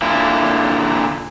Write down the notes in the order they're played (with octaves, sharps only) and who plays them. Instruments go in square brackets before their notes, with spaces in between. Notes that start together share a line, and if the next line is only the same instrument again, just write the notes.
[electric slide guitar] A#2 D3 E4